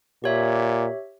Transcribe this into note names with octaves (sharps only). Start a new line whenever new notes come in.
A#2 G4 C#5 E5